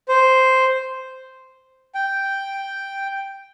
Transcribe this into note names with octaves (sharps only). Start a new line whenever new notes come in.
C5
G5